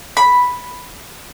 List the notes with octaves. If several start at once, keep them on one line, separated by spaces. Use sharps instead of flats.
B5